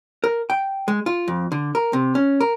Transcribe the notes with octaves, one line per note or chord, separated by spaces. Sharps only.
A#4
G5
G#3
F4
F2
D3
A#4
C3
C#4
A#4